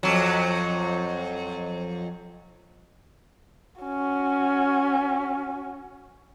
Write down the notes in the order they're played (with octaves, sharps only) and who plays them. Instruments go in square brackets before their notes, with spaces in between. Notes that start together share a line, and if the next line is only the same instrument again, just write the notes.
[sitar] F2 F#3
[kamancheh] C#4 F#4